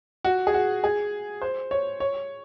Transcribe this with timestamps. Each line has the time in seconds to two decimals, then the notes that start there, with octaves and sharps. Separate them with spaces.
0.24 F#4
0.47 G#4
0.54 F#4
0.84 G#4
1.42 C5
1.71 C#5
2.00 C#5